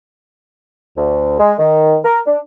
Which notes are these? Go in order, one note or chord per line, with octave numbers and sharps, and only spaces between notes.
D2
G#3
D#3
A#4
D4